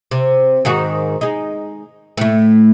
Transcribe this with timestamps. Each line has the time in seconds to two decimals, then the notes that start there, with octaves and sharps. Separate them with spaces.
0.11 C3
0.65 G#2 D#3 F#4
1.21 G#3 D#4
2.18 A2 A3